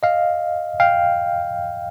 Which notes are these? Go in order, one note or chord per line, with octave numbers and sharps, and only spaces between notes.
D#5 F5
F5 G5